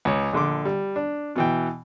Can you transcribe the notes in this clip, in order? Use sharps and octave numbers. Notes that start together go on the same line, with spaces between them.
C#2 C#5
A#1 D3 C6 D6
G3
D4
B2 E3 G5